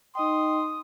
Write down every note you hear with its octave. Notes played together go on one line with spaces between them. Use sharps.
D#4 D#5 G5 C6 D#6